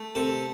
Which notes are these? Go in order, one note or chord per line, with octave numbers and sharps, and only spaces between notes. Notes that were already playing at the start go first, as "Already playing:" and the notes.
Already playing: A3
C3 A4